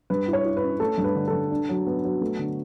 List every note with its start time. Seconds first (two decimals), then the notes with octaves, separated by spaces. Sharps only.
0.10 G2 B4
0.28 E4
0.33 C#5
0.45 E4
0.57 B4
0.63 C#4
0.80 A3 A4
0.98 G2
1.04 B4
1.16 D3
1.28 A4
1.33 G2
1.51 D4
1.69 F#3
1.86 B3
2.04 F#3
2.21 A3
2.39 D3